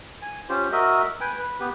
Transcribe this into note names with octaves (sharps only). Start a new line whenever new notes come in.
G#5
C#4 F4 G4 C5
F#4 A#4 D#5 E5
B4 G5 G#5
B4
B3 G4 B4